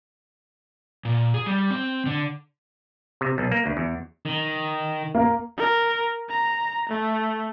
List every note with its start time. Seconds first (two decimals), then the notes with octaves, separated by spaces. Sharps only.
1.05 A#2
1.34 G#4
1.46 G3
1.71 C4
2.06 D3
3.21 C3
3.38 B1
3.51 A#3
3.66 D2
3.77 E2
4.25 D#3
5.15 A#3 A#4
5.57 A#4
6.29 A#5
6.89 A3